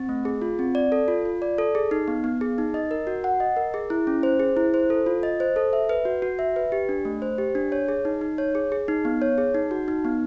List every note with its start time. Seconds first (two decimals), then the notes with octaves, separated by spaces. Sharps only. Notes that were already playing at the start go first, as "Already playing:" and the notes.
Already playing: C4
0.09 A3
0.25 G#4
0.42 F4
0.59 C4
0.75 D5
0.92 A4
1.08 F4
1.25 F4
1.42 D5
1.58 A4
1.75 G#4
1.91 D#4
2.08 B3
2.24 B3
2.41 G#4
2.58 D#4
2.74 D#5
2.91 A#4
3.07 F#4
3.24 F#5
3.40 D#5
3.57 A#4
3.74 G#4
3.90 E4
4.07 C#4
4.23 C5
4.40 G#4
4.57 E4
4.74 C5
4.90 A4
5.06 F4
5.23 D#5
5.40 C5
5.56 A4
5.73 E5
5.89 B4
6.05 F#4
6.22 F#4
6.39 E5
6.56 B4
6.72 G4
6.89 D4
7.05 A3
7.22 C5
7.38 G4
7.55 D4
7.72 C#5
7.89 G#4
8.05 D#4
8.21 D#4
8.38 C#5
8.55 G#4
8.72 G#4
8.88 D#4
9.05 B3
9.22 C#5
9.38 G#4
9.55 D#4
9.71 F#4
9.88 D#4
10.05 B3